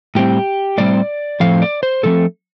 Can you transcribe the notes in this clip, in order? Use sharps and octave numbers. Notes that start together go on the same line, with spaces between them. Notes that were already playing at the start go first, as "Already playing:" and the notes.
A2 G3 C4 G4
A2 G3 C4 D5
A2 F3 A3 C4 F5
D5
C5
A2 F3 A3 C4 A4